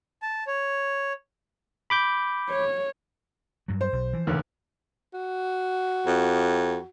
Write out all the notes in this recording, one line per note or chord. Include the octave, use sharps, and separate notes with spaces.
A5
C#5
B5 D6 G6
C#5
G2 F#3
C5
B1
E3 F3
F1 D#2 D3
F#4
F2